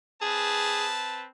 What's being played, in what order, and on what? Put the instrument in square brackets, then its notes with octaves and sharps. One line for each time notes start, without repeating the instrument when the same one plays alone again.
[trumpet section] C4 B4 A5 [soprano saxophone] G#4